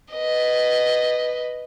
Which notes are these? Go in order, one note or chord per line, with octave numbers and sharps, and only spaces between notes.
B4 D#5